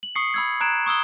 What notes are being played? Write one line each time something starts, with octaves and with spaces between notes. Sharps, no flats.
F#7
C#6 D#6 C7 C#7
B5 E6 G#6
A#5 F#6 G#6 D7 E7
C#6 D#6 E6 G7